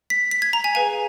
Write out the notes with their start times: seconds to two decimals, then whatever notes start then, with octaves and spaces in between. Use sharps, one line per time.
0.10 B6
0.31 B6
0.42 G#6
0.53 A#5
0.64 G#5
0.75 G#4 B4 F5 G#5